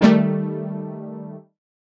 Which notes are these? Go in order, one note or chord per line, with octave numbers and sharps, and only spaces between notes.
D#3 G3 A3